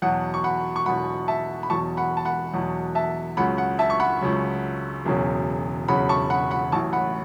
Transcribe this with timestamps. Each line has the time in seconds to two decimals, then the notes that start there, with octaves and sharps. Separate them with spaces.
0.02 E2 B2 F#3 F#5
0.34 C#6
0.44 F#5 B5
0.76 C#6
0.86 E2 B2 F#3 F#5 B5
1.28 E5 A5
1.63 B5
1.70 E2 B2 F#3 A5 C#6
1.97 F#5 B5
2.17 A5
2.25 F#5 B5
2.54 E2 B2 F#3
2.95 E5 A5
3.37 C#2 C#3 F#3 F#5 B5
3.58 F#5
3.79 E5 A5
3.90 C#6
4.00 F#5 B5
4.21 C#2 C#3 F#3
5.05 E1 E2 C#3 F#3
5.88 E1 E2 C#3 F#3 F#5 B5
6.09 A5 C#6
6.30 F#5 B5
6.51 F#5 B5
6.72 A1 A2 F#3 A5 C#6
6.93 F#5 B5